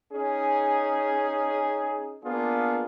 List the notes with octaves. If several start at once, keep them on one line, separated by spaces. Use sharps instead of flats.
C#4 D#4 G#4
A#3 B3 D4 F4 G#4